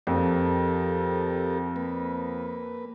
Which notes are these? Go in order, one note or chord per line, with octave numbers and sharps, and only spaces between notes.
F2 G4 A4 A#4
A#3 B4